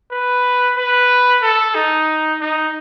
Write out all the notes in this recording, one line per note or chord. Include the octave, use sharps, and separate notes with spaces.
B4
B4
A4
D#4
D#4